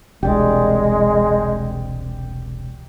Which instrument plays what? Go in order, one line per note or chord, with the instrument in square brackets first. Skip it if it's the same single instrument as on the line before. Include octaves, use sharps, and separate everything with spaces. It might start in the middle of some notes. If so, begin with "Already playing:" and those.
[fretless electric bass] E1 C2 [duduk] G#3 [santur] G4 D5